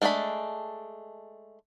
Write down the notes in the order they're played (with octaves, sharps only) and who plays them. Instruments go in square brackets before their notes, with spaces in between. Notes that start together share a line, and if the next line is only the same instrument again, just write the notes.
[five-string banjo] G#3 A3 D4 F#4 B5